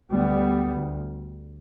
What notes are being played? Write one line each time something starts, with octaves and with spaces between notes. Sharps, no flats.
D2 G3 B3
D2